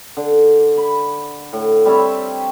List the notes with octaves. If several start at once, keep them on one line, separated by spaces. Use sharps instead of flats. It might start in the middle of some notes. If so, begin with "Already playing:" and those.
D3
B5
A2
G3 C4 C#5 E5